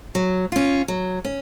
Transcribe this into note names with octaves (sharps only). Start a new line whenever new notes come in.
F#3
C#4 F4
F#3
C#4